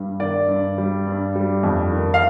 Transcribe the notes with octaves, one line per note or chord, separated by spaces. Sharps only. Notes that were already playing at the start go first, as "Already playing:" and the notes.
Already playing: G2 G3
D#3 D5
G2
G3
G2
G3
F2
D#3
F5